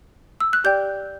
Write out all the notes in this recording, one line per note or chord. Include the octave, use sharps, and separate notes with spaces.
E6
F#6
G4 D5 G5 G6